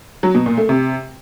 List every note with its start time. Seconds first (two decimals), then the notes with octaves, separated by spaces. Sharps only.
0.23 F#3
0.35 B2
0.46 A#2
0.57 A3
0.69 C3